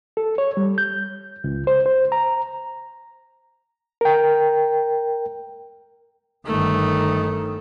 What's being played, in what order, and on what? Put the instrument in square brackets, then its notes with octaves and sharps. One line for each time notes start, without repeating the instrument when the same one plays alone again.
[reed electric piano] A4
C#5
G3
G6
C#2
C5
C5
A#5
A#4 G5
[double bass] G1 D#3 [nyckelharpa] A3